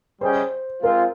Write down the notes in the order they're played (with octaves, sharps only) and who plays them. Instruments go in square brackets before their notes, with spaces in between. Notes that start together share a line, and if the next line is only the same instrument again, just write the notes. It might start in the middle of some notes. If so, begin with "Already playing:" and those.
[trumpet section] G3 C#4 G#4 D#5 G5 [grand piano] C5
[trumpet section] G#3 C4 F4 [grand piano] A#4